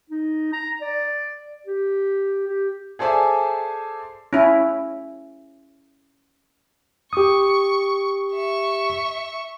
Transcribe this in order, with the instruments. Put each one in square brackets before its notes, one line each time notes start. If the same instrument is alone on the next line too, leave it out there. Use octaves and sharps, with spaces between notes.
[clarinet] D#4
A#5
D5
G4
G4
[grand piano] G#4 A4 C5 D5 E5 G#5
[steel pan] C#4 E4
[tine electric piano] G4 D#6 [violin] C#6
[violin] E5 C#6